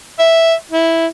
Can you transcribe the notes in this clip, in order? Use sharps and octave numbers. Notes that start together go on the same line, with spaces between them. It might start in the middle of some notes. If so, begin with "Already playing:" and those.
E5
E4